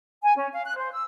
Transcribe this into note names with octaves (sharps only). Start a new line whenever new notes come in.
G#5
C#4
F5
F#6
C5
E6